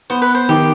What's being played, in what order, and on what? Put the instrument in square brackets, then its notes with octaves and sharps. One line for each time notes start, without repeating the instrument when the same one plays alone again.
[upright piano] B3 [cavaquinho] C5
[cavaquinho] B4
C5
[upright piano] D#3 [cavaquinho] G4